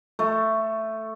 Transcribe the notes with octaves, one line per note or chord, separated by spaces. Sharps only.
A3